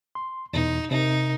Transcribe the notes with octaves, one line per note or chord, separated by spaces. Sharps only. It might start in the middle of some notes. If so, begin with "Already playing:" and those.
C6
E2 B2 D#4
C3 D#4 A#4